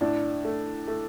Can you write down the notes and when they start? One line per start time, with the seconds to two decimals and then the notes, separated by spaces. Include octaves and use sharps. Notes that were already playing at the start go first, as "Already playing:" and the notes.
0.01 A2 D4
0.45 A3
0.88 A3